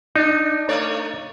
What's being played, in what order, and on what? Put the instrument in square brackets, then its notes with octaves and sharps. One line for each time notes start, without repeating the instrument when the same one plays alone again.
[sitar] D4 [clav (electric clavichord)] D#4
[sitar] A3 C#5 D5